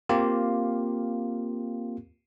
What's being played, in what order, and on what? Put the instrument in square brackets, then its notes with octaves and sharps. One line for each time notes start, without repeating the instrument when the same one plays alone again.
[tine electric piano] A#3 C4 F4 G4